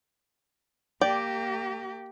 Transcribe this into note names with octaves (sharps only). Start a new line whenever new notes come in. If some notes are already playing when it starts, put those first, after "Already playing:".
A#3 G4 D5 G5